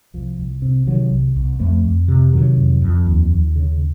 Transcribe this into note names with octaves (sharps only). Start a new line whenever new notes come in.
C2 F3
C2
C3
C3 D#3 F#3
C2
C2
F2 F3 A3
F2
C3
C3 D#3 F#3
F2
F2
D#2
D#2
C#3